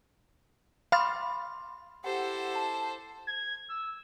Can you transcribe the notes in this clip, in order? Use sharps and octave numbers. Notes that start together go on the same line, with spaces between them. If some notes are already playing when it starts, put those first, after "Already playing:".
F5 B5 C6 D6 F6 A6
E4 G4 A4 C5 F#5
A5
G#6
E6